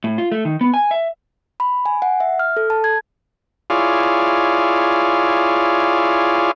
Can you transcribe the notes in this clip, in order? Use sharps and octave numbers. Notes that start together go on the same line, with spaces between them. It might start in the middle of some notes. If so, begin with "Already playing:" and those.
A2
F4
A3
D#3
B3
G#5
E5
B5
G#5
F#5
E5
F6
A4
A5
G#6
E4 F4 G#4 C#5 D5 F5